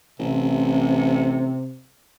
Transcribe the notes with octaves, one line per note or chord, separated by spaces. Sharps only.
A1 C3